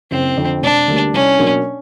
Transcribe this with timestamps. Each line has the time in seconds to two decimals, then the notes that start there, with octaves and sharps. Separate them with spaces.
0.11 F#1 C4
0.37 F2 D3
0.62 E1 D4
0.87 D2 D3 G3 A#3
1.13 C2 C#4
1.39 B2 F#3 A#3 D4